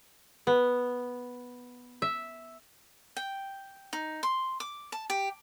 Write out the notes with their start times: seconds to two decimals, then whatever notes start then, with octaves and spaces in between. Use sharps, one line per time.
0.47 B3
2.02 E5
3.17 G5
3.93 D#4
4.23 C6
4.60 D6
4.92 A5
5.10 G4